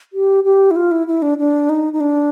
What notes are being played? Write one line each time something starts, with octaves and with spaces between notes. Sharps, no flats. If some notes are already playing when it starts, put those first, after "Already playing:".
G4
G4
E4
F4
E4
E4
D4
D4
D#4
D#4
D4